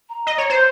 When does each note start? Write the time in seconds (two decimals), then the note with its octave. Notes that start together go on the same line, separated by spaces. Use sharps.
0.09 A#5
0.27 D#5
0.38 C#5
0.50 C5